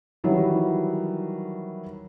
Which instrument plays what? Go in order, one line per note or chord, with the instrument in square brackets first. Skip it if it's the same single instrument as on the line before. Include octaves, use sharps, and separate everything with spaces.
[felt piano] D#3 E3 F#3 G3